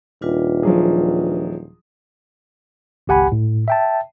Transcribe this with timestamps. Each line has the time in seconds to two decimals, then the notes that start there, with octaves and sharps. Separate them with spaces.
0.22 D#1 D4 F4 B4
0.63 F3 F#3 G#4
3.07 G#1 C#2 G4 F#5 G#5 B5
3.32 A2
3.68 E5 G5 A5